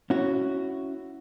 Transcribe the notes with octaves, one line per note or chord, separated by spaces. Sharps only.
C#4 E4 F#4